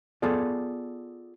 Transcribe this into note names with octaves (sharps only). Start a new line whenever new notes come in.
B3 F4 G#4 A4 D5